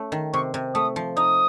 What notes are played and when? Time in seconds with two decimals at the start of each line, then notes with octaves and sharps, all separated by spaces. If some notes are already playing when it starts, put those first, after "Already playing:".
Already playing: A3 C#4
0.12 D#3
0.33 C3 C#6
0.54 C3
0.74 A3 D#6
0.96 F3
1.17 D#4 D#6